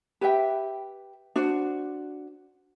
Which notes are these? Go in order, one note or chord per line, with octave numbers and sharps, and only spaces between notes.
G4 B4 E5 G5
D4 F#4 C5